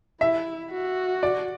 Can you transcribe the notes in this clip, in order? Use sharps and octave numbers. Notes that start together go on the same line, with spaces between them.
E4 E5
F#4
D5